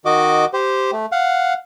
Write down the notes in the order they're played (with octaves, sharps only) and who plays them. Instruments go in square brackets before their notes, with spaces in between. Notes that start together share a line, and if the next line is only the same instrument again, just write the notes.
[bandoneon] D#3 F#4 D#5 D6
G4 C5
A3
F5 F#5